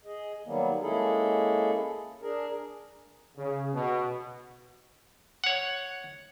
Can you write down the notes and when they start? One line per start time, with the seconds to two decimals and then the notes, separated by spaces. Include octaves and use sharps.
0.05 G#4 D#5
0.45 D#3 F#3 G3 A#3 B3
0.81 G#3 A#3 C#4 E4 G#4 A4
2.21 D4 G#4 A#4
3.37 C#3
3.74 B2
5.44 C#5 F#5